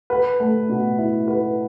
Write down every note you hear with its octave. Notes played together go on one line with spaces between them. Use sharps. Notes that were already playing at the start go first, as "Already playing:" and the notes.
B4
A3
B2
E4
B4